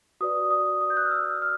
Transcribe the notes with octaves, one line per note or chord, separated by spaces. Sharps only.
F#4 B4 D5 D#6
D#6
D#6
G6
F#6
F6
E6
F6